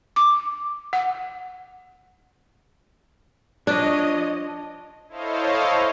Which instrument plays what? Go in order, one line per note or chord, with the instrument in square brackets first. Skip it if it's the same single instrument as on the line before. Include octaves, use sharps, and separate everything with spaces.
[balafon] D6
F#5
[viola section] F3 C#5 D#5 [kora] D4
[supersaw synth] E4 A4 C5 C#5 D#5 F5